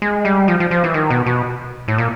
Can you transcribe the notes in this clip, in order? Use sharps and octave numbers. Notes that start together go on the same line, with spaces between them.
G#3
G3
F3
F3
F3
E3
D#3
B2
B2
A2
A#2